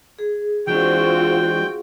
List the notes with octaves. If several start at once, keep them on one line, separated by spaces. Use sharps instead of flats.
G#4
E3 G#3 C4 D4 F4 F#4 G5